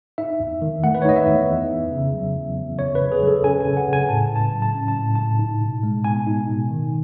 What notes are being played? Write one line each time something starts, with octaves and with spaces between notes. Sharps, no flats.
D#4 E5
E2
D#3
A3 F#5
B4
C#5
D#4 D#5
E5
E2
E2
E2
C#3
F#3
E2
E2
C#3 C#5
B4
C#3
G#4
F#3
A4
C#4 G#5
G#5
C#3
F#5
C#3
G#5
A2 A5
A2
A5
F#3
A5
C#4
A5
A2
A2 A5
D#4
B2
G#3
B3 G#5
D#4
B2
D#3